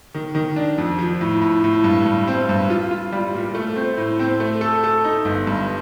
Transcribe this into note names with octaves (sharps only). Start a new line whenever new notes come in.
D#3
D#3
D4
F2
F3
A2
A2
A2
G2
G2
C4
G2
F4
F4
G3
A#2
A3
C4
A2
C4
A3
A4
A4
D#4
G1
G2